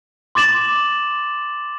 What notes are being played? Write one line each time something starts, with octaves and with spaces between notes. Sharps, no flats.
C6 D6 A6 E7 F#7